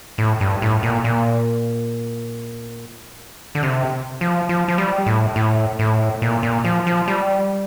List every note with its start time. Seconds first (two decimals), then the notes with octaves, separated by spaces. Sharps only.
0.18 A2
0.41 G2
0.62 A2
0.83 A#2
1.04 A#2
3.55 D3
3.63 C3
4.21 F3
4.49 F3
4.68 F3
4.78 G3
5.06 A2
5.36 A2
5.79 A2
6.22 A#2
6.43 A#2
6.65 F3
6.87 F3
7.08 G3